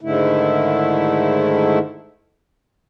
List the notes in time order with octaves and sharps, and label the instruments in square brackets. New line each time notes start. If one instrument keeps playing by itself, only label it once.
[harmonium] G#2 D3 D#3 A3 E4